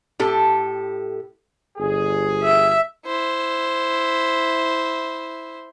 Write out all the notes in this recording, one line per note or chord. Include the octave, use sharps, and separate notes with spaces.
A2 G4 A4
G1 G#4
E5
E4 C5